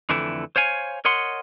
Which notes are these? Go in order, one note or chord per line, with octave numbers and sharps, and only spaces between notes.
F2 D3 E3 A3 E4
C5 C#5 F5 G#5
A#4 C#5 D#5 F#5 C6